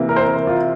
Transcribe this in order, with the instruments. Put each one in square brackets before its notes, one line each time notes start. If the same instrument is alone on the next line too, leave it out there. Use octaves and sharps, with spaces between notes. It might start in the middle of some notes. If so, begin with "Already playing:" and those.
Already playing: [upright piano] C3 E3 A#3
[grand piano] A#4
C5
A#4
F4